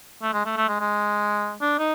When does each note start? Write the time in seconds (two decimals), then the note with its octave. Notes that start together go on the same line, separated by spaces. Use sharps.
0.22 A3
0.34 G#3
0.46 A3
0.57 A3
0.68 G#3
0.80 G#3
1.61 D4
1.79 D#4